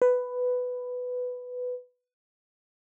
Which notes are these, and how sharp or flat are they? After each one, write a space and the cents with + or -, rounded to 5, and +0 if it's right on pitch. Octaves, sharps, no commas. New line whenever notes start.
B4 +10